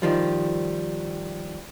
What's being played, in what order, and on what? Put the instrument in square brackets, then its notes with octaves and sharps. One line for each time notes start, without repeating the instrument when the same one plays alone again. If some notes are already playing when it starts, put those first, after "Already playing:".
[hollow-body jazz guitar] D#3 F3 G3